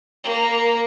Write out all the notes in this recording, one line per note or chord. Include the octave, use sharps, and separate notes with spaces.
A#3